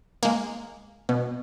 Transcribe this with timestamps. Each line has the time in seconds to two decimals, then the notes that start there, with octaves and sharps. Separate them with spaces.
0.23 G#3 A#3
1.09 B2